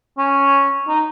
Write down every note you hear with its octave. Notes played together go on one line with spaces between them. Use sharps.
C#4
D#4